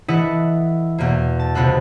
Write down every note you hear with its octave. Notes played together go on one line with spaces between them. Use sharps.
E3 E4 A4 D#5 E5 F#5
E2 B2 A#3
A5
C#2 C3 B3 F4 A4 F#6